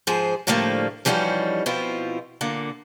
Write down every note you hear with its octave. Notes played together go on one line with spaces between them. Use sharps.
G#2 F3 G#4 C5
A2 D3 F3 G3 A3 A#3
E3 F3 G3 C#4 D#4 F#4
B2 F3 C4 E4 F4
A#2 D3 A#3